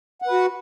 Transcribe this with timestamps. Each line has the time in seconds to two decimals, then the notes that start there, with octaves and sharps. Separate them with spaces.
0.22 F#5
0.27 B4
0.32 F#4